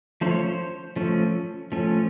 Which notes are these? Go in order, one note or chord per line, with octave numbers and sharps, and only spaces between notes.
F3 A3 C#4 C5
C#5
C5
F3 A3 C#4
F3 A3 C#4